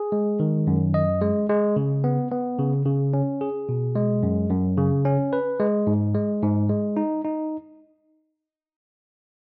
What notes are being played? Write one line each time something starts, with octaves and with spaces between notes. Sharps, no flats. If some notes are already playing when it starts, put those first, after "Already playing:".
Already playing: G#4
G#3
D#3
F#2
D#5
G#3
G#3
C#3
B3
B3
C#3
C#3
C#4
G#4
B2
G#3
F#2
F#2
C#3
C#4
B4
G#3
G#2
G#3
G#2
G#3
D#4
D#4